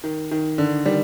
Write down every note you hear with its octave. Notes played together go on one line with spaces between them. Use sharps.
D#3
D#3
D3
D#3 G3